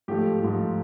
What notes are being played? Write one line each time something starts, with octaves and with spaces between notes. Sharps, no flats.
G#2 F3 A3 G4
G#2 F3 A3